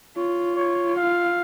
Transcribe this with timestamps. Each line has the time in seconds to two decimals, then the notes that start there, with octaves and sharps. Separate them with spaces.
0.16 F4 C#5
0.56 C#5
0.97 F5